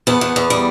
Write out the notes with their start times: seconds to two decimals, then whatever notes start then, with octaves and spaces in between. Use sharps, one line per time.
0.07 E2 B3
0.21 E2
0.36 E2
0.50 G3